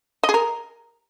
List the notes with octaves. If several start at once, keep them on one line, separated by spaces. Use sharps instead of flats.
D#5
G#4
A#4